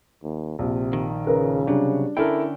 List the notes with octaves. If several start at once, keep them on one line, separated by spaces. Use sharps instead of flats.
D#2
A#1 C3
D#3
C#3 A#4 B4
C3 F#3 G3 D4
D3 C#4 E4 A4 A#4 G5